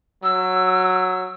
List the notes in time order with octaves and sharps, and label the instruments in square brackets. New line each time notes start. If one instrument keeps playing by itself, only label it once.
[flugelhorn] F#3 [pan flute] E6